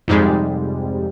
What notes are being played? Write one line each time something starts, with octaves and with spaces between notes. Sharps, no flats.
F2 G#2 C3 G3 G#3